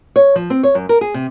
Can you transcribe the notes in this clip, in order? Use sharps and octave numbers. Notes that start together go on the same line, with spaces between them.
C#5
F3
C4
C#5
F#2
A#4
G#4
C3